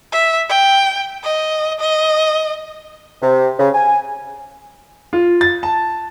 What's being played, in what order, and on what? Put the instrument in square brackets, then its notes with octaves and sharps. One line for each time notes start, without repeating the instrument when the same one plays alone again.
[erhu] E5
G5
D#5
D#5
[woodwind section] C3
C#3
G#5
[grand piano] F4
A6
A5